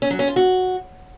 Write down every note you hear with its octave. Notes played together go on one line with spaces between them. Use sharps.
C#4
F#3
C#4
F4
F#4